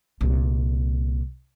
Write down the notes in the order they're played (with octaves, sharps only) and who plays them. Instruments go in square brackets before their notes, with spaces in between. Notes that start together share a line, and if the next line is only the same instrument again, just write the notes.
[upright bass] C2 A#2